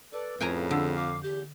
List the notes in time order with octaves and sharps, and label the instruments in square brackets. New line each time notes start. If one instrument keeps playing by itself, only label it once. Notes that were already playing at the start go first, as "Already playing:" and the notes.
[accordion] A4 D5 [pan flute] B4
[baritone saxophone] F2 [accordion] A2 C#3 [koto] G5 G#5 A#5
[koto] D3 [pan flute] E6
[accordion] F5 [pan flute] D6
[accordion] E2 G6 [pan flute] G4